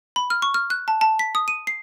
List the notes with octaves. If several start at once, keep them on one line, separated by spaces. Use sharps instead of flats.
B5
F6
C#6
F6
F#6
A5
A5
B6
D#6
D#7
C7